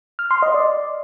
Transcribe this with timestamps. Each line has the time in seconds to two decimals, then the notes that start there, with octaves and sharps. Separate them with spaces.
0.19 F6
0.31 C6
0.42 D#5
0.54 D5